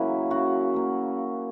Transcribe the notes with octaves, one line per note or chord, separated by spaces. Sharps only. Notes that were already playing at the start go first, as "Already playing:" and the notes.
Already playing: C#3 F#3 A#3 E4
C#3 F#4
F#3 A#3